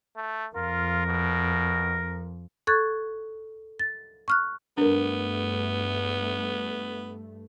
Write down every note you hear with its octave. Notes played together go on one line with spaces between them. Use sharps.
A3
F2 F4 A#4
B2
A4 C#6 F#6 G#6 A6
A6
C#6 F6 F#6
G2 A3 B3 D4 A#4